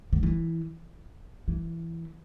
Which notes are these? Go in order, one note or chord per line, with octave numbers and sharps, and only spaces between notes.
D3
E3
E3